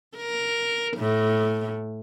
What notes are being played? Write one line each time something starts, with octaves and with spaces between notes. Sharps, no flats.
A#4
A2